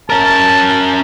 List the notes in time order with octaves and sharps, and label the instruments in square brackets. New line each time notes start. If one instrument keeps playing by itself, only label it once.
[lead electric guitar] C#4 A#4 [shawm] A5